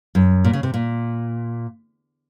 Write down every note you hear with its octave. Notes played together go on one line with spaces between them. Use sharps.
F#2
A#2
C#3
C3
A#2